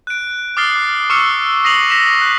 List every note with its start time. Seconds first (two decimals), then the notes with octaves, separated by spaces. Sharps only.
0.07 F#6 D7
0.57 D6 D#6 F6 A6 C7 G7
1.10 C#6 D6 E6 F6 C#7
1.64 D#6 A#6 C7 D#7 F7 F#7
1.90 A#6 B6 E7
2.22 F#6